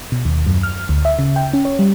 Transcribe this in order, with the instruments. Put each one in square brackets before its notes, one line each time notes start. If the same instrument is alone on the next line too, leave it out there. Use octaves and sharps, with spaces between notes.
[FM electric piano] B2
D#2
F#2
F6
D2
E5
C#3
G5
C#4
C#5
G3